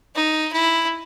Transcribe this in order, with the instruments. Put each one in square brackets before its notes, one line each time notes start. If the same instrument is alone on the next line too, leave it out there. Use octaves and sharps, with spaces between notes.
[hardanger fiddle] D#4
E4